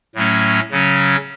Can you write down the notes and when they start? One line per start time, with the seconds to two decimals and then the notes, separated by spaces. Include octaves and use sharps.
0.15 A2 F#3 A3 C#4
0.71 C#3 F#3 C#4